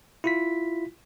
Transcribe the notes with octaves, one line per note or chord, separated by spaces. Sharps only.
E4 F4 B6